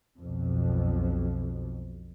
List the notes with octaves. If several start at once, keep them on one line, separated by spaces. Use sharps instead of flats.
B1 F2